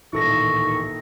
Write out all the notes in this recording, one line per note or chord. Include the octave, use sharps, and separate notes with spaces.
D1 A1 A#2 D#3 E4 A4 C#6 A#6